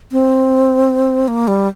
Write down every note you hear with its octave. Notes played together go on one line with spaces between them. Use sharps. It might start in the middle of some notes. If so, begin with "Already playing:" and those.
C4
A#3
G3